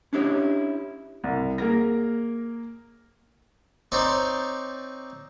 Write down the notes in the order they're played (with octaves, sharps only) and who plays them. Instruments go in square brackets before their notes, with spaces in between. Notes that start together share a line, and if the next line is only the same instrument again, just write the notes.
[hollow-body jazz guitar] C#4 D4 E4 G4 C#5
[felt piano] C2
A#3 G#4 A#4 A#6
[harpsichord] C4 D#4 C#5 D5